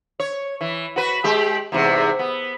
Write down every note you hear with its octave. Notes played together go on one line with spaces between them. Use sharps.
C#5
E3
F#4 B4
G#3 G4
E2 G#2 C3
B3